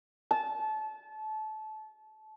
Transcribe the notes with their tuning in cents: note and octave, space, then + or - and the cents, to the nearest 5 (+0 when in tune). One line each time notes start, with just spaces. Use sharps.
A5 -25